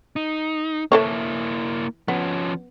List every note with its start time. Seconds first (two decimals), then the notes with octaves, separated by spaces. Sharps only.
0.16 D#4
0.92 E3 A#3 E4 A4 C#5
2.08 F3 B3 C#4